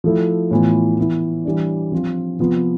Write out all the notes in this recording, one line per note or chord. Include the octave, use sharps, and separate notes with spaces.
F3 A3 E4
A2 E3 B3 F4
E3 B3 E4
E3 G3 D4
F3 C4 F4
C3 F3 B3 F4